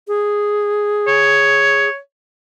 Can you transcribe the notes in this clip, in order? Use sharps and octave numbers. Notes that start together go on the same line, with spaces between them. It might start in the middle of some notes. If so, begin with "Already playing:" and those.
G#4
C#5